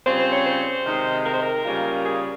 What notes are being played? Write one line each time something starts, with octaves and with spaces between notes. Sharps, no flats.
C#3 G3 C4 F4 C5
C5
C#5
C5
C3 D#3 G#3 D#4
A#4
C5
A#4
C#3 G3 A#3 F4
G#4